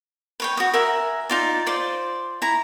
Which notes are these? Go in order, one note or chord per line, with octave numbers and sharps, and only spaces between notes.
B4 C#5 G5
F#4 D#6
A#4 E5 F#5 G#5
D#4 F4 D5
F4 C5 D5
E4 A#5